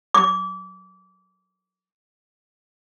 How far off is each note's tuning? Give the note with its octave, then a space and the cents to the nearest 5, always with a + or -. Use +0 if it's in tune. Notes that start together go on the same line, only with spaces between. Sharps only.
D6 -30